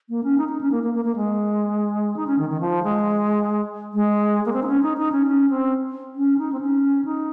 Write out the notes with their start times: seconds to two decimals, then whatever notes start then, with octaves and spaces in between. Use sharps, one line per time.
0.09 A#3
0.23 C#4
0.38 D#4
0.49 D#4
0.61 C#4
0.72 A#3
0.83 A#3
0.94 A#3
1.05 A#3
1.16 G#3
2.17 D#4
2.27 C#4
2.39 D#3
2.50 D#3
2.61 F3
2.83 G#3
3.94 G#3
4.46 A#3
4.53 C4
4.63 D#4
4.67 C#4
4.83 D#4
4.98 D#4
5.12 C#4
5.27 C#4
5.50 C4
6.16 C#4
6.38 D#4
6.53 C4
6.61 C#4
7.05 D#4